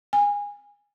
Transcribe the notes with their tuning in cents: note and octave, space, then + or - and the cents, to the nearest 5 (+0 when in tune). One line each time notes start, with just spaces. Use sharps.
G#5 -20